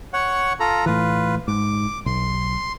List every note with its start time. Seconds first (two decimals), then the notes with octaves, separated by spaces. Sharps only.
0.13 C#5 F#5
0.60 F4 A4 A#5
0.86 A2 E3 F4 B4
1.48 G#2 D6
2.06 B1 C6